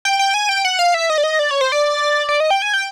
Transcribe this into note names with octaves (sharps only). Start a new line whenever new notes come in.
G5
G5
G#5
G5
F#5
F5
E5
D#5
D5
D#5
D5
C#5
C5
D5
D5
D#5
G5
G#5
G5